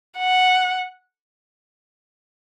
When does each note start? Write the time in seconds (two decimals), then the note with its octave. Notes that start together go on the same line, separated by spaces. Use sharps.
0.18 F#5